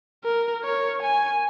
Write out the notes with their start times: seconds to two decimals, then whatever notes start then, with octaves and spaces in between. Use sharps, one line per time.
0.24 A#4
0.64 C#5
1.03 G#5